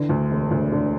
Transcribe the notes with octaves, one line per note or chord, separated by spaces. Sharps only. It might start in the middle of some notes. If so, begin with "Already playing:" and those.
Already playing: D3 E3
D2
E1
D2
D3